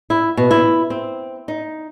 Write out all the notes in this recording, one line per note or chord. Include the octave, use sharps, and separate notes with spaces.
E4
B2
E4
C4
D#4